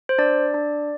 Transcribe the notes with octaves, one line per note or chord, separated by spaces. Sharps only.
C5
D4 D5
D4